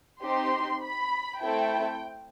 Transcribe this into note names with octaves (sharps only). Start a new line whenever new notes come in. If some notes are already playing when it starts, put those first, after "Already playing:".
C4 D#4 G4 C6
B5
A3 C4 E4 A4 G5